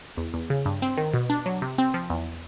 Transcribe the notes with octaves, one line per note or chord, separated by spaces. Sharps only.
E2
E2
C#3
G2
C4
D#3
B2
D4
F#3
C3
C4
F3
E2